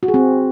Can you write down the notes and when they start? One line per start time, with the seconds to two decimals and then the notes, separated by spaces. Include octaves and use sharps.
0.03 F#4
0.08 G#4
0.14 C4